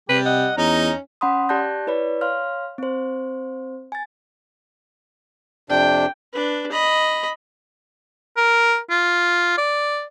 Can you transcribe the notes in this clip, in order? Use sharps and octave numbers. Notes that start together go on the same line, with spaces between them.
C3 G3 G4 B4
D#5 F#5
E2 C#4 D#4 A#5
C#4 F#5 B5 C6 D#6
G4 D5 A5 F#6 G6 A#6
E4 B4 C#5 D5 B5
C#5 F5 C6 F6
C4 C5
G#5 A6
F2 C3 D4 G5
D4 B4
D#5 B5
A#4
F4
D5